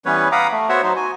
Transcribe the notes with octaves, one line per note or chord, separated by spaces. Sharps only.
E3 G3 B3 C#4 B4 C#5
F5 F#5 A#5 B5 D6 D#6
A3
B3 F#4 C5 C#5 E5 F#5
F#3 D#4 C5
F#4 G#5